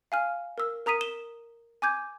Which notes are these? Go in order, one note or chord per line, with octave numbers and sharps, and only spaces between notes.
F5 G#5 F6
A#4 E6
A#4 A#5 D#6 B6 D#7
E7 G7
G#5 D6 G6 G#6